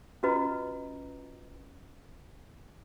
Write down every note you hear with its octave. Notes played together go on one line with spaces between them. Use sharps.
C#4 F4 F#4 B4 D#5 A#5